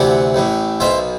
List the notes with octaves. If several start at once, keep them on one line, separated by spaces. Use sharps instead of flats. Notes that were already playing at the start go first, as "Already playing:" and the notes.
Already playing: D2 C3 E3 D5 F#5
A1 A2 E3
B1 B2 C5 E5